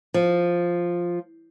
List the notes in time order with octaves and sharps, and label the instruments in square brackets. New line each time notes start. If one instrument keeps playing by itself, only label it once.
[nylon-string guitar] F3